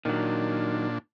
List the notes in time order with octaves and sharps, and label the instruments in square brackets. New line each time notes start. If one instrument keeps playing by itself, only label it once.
[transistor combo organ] A#2 D4 [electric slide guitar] D#3 F#3